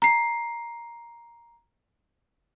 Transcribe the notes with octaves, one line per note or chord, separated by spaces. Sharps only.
A#5 C7